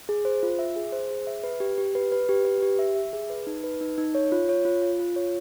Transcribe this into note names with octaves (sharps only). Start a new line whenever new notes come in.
G#4
C5
F4
E5
G#4
C5
G#4
E5
B4
G4
G4
B4
B4
G4
B4
G4
E5
E5
G#4
B4
D#4
B4
D#4
D#4
C#5
F4
C#5
F4
F4
F4
C#5